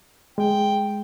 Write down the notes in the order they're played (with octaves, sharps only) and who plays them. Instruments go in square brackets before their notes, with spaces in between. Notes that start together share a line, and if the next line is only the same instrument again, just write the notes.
[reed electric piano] G#3 [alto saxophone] G5